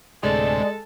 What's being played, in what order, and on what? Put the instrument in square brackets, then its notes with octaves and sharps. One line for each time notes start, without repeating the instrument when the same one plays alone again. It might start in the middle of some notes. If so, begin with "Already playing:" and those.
[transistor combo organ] D2 A2 C3 [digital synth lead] G#3 [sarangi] A4 [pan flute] D5